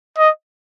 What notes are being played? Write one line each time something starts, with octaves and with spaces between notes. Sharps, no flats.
D#5